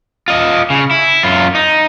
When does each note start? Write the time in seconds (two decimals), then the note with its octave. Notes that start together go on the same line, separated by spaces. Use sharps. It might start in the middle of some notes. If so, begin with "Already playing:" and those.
0.28 F4 D#5
0.70 C#3
0.91 E4
1.23 F#2 F4
1.55 D#4